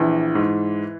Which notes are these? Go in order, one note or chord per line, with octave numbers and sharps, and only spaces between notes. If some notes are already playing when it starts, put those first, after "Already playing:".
Already playing: A#1 E3
G#2